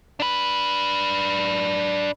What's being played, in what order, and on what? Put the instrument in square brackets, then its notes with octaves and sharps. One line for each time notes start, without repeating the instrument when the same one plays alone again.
[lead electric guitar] D4 B4